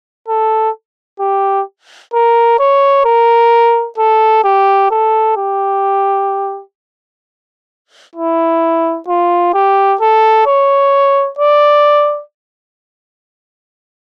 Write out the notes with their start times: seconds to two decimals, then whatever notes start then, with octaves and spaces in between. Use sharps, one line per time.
0.28 A4
1.20 G4
2.14 A#4
2.60 C#5
3.05 A#4
3.98 A4
4.44 G4
4.91 A4
5.37 G4
8.16 E4
9.08 F4
9.54 G4
10.01 A4
10.46 C#5
11.39 D5